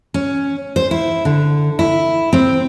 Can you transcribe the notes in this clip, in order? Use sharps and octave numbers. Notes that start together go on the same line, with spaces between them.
C#4
C5
E4
D3
E4
C4